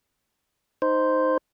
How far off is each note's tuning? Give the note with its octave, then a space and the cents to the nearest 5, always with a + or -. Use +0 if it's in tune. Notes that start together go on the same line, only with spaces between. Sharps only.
D#4 +0 C5 -5